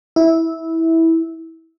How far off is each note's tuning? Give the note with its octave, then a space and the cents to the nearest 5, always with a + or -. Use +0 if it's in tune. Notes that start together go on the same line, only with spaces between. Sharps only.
E4 -15